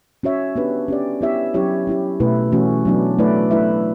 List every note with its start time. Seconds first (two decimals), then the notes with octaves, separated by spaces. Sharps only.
0.23 C#4 F#4 C#5 E5
0.56 B3 D4 G4 B4
0.88 C#4 G4 D5
1.21 B3 E4 G4 C#5 E5
1.54 F#3 C#4 E4 G4 C#5
1.87 C#4 E4 G4
2.20 B2 A3 E4 B4
2.52 E3 A3 C#4 F#4
2.85 F#3 B3 D4
3.19 A3 E4 B4 D5
3.51 A3 E4 B4 E5